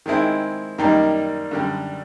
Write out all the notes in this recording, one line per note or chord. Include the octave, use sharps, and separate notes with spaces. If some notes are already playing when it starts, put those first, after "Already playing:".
D#3 G#3 C4 E4
F#2 D#3 G3 A#3 D#4
F#2 D3 G3